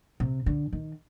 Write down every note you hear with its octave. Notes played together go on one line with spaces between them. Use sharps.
C3
D3
D#3